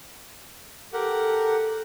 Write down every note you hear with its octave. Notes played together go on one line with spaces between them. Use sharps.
G4 A4 A#4 F#5